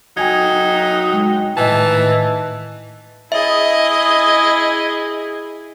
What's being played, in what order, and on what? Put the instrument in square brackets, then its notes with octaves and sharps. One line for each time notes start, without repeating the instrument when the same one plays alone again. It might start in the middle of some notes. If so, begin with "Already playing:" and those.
[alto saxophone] F#3 [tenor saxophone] D#4 [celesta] G5 G#5 G#6
[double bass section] G#3 [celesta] G5
[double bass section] A2 D#3 [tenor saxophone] E3 [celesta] D#5 G#5 [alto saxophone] A5
[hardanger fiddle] E4 G#4 [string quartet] D#5 [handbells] E5